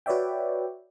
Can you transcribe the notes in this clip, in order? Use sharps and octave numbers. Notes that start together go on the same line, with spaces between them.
F#4 B4 C#5 D5 E5 G5